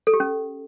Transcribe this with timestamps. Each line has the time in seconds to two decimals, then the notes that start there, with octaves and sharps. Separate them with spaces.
0.07 A4
0.13 G4
0.20 C#4